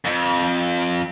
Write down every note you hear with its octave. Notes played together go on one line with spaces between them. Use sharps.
F2